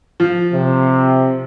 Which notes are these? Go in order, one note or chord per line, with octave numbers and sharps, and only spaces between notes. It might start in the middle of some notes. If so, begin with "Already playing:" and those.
F3
C3